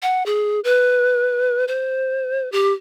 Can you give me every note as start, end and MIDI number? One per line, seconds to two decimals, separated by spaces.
0.02 0.25 78
0.26 0.60 68
0.64 1.65 71
1.68 2.51 72
2.52 2.73 67